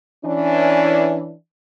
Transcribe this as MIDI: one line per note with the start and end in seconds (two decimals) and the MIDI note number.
0.25 1.34 52
0.25 1.34 61
0.25 1.34 62